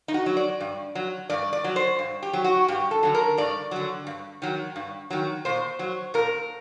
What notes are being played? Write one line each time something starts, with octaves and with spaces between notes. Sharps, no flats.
D#4
F#4
F#3
D5
G2
F#3
G2 D5
D5
F#3
C5
G2
G4
F#3
F#4
G2 G4
A4
D3 F#3
A#4
G2 D5
D3 F#3
G2
D#3 F#3
G2
D#3 F#3
A#2 C5
F#3
A#2 A#4